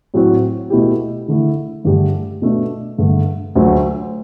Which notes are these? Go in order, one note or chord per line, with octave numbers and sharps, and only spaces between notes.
A2 F#3 C4 F#4
B2 A3 E4 G4
D3 A3 E4
G2 D3 A3 D4 G4
B2 A3 D4
G2 D3 A3
D2 D3 F#3 A3